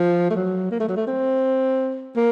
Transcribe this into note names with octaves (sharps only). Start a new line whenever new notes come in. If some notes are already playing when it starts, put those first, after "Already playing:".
Already playing: F3
A3
F#3
A#3
A3
F#3
A3
C4
A#3